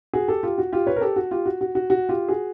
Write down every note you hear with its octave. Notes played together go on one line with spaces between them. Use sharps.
F#4 G#4
G4 A4
F4 G4
F#4
F4 G4
B4 C#5
A#4
G4 A4
F#4
F4 G4
F#4
F#4
F#4
F#4
F4 G4
F#4 G#4